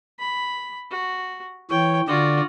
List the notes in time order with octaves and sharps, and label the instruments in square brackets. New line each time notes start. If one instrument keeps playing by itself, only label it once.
[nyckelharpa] B5
F#4
[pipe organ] E3 C#5 [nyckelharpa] G5
[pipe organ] D3 D5 [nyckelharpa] F4 F#4